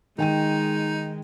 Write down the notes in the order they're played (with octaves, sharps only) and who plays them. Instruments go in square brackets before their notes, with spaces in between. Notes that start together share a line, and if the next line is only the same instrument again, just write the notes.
[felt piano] D#3 G5 D#7 [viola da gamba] G#3 [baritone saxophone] D#4